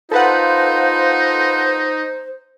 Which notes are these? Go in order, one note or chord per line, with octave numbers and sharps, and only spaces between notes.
D#4 F4 A4 B4 C5 F#5